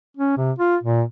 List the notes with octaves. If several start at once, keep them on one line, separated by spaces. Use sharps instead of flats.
C#4
C3
F4
A#2